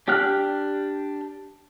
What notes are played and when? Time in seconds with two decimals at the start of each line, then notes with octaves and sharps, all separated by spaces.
0.08 D4 G4 G5 F6 F#6